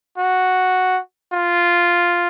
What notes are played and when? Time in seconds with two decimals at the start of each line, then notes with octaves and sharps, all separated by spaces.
0.18 F#4
1.33 F4